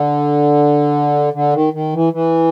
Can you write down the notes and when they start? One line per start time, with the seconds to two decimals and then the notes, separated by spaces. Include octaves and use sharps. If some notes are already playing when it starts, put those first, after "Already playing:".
Already playing: D3
1.33 D3
1.54 D#3
1.73 D#3
1.94 E3
2.13 E3